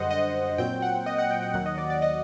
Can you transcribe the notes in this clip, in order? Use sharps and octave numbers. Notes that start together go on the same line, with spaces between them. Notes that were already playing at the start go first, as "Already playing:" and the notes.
Already playing: F#2 D3 G3 C5 D#5 F#5
D#5
A#2 F#3 C4 G5
F#5
D#5
F#5
G5
F#5
D#2 D#3 F#3 F#5
D#5
D5
D5
D#5